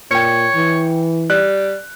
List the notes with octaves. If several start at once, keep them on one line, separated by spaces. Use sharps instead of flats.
A#2 C#5 G5 C#7
E3
G3 F#6